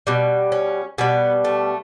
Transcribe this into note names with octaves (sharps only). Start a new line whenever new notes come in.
B2 G3
C#4
B2 G3 B3
A3